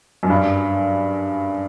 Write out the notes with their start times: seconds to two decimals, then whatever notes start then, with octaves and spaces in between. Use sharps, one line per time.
0.23 F#2
0.30 G2